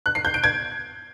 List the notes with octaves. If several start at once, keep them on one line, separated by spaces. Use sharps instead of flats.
F#6
C7
G6
D7
G#6